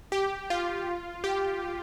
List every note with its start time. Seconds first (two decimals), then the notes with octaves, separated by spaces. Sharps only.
0.12 G4
0.50 F4
1.24 G4